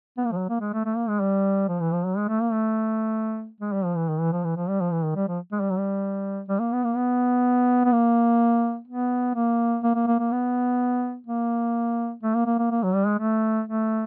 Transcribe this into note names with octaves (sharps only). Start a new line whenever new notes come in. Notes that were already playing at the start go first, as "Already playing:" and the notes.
B3
A#3
F3
F#3
A#3
G#3
A3
A3
A#3
G#3
G3
F3
E3
F3
F#3
G#3
A3
A#3
A3
G#3
G3
F3
E3
D#3
E3
F3
E3
F3
G3
F3
E3
D#3
G3
F3
G#3
G3
F#3
G3
G3
A#3
B3
A#3
B3
B3
A#3
B3
A#3
A#3
A#3
A#3
A#3
B3
A#3
A3
A#3
A#3
A#3
A#3
F#3
G3
G#3
A3
A3